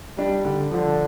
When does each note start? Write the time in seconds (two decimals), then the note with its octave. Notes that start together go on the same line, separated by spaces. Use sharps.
0.18 G3 D4
0.45 D3
0.71 D3 F3